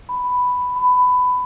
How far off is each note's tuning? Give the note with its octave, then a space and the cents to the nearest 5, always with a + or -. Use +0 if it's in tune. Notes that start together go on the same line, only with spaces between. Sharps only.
B5 +5
B5 +15